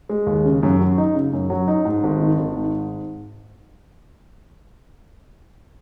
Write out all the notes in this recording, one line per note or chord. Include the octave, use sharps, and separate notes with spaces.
G#3
D#2
C#3
F#2
F#3
D#4
C#3
F#2
F#3
D#4
G#2
G#1
D#3
G#1
G#2